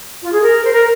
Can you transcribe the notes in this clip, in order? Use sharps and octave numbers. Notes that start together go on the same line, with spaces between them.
F4
G#4
A#4
C5
A#4